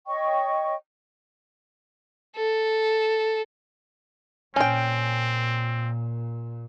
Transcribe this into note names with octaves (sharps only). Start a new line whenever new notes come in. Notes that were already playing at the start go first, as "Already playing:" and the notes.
C#5 D#5 G5 C#6
A4
A#2 C4 C#4 G5